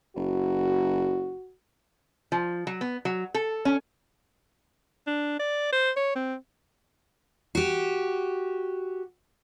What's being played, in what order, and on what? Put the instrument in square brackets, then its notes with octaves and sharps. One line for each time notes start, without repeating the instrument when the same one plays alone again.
[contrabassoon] F#1 [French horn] F#4
[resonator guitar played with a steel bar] F3
F#3
B3
F#3
A4
C#4
[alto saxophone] D4
D5
C5
C#5
C4
[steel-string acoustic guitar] F#4 G4